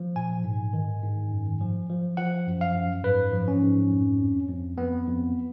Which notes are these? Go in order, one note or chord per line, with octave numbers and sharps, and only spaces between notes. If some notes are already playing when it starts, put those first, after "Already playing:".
Already playing: F3
A#2 G#5
G#2
D#3
G#2
F#2
F3
F3
F3 F#5
F#2
F5
F#2
G#2 B4
F3
C#4
G#2
F2
F2
F2
F2 B3
F2